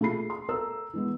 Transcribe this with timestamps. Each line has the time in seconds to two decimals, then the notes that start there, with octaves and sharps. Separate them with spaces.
0.01 A3 F4 G#4 B5 C7
0.30 C6
0.48 A4 A#4 A#5 E6
0.93 E3 G#3 B3